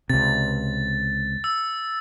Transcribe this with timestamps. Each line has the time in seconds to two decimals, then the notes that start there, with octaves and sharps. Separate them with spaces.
0.10 C#2 C3 A6
1.44 E6